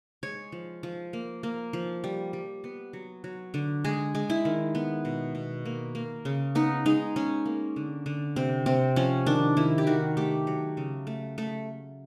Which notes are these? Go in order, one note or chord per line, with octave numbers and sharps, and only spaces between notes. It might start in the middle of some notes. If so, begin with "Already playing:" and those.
G#3 C#5
F3
F3
A#3
A#3
F3
G3
G3
B3
F#3
F#3
D3
G#3 G#4
G#3
E4
D#3
B3
B2
B2
A#3
A#3
C#3
B3 D#4
G#3 D#4
G#3 C#4
A#3
D3
D3
C3 C4
C3 C4
F3 C#4
D#3 D4
D#3 E4
G4
D#3 F#4
A3 G4
F#3
C#3
A3
A3